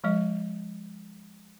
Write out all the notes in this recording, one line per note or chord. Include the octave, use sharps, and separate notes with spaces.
F3 G#3 D#5